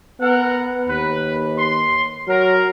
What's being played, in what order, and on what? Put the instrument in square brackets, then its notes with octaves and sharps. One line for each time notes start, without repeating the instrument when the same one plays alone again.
[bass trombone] B3 [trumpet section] A#4 F#5
[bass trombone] D#2 [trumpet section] B4
[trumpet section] C6
[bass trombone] F#3 [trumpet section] A#4